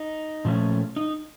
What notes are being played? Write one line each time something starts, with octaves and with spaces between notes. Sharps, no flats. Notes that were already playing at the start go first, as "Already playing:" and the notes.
Already playing: D#4
A#2 F3 A3 C#4
D#4